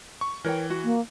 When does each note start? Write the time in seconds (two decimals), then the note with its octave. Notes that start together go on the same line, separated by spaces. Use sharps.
0.21 C#6
0.44 E3 A#4 C#5 G5
0.70 F#4
0.84 A#3